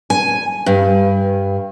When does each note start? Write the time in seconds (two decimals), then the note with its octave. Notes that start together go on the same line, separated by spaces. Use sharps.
0.10 G#5
0.66 G2